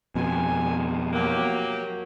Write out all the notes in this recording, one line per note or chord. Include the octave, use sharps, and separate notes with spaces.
F2 B2 G#5
F#3 A#3 G4